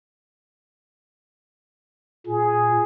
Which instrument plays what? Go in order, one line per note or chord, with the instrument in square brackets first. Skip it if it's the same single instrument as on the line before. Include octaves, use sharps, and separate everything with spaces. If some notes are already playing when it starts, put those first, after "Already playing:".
[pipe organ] A#2 [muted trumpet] G#4